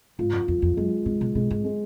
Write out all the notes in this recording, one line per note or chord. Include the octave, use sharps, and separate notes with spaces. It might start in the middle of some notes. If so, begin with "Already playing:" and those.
G#2 F4
F#2
F2 F4
F2
F#2 G#3
A2 G#3
B2
B2 G#3
G#2
G#3